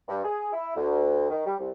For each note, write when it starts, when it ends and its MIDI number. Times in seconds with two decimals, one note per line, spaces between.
0.08 0.23 43
0.24 0.48 68
0.53 0.74 64
0.76 1.29 38
1.30 1.45 51
1.46 1.56 55
1.59 1.70 36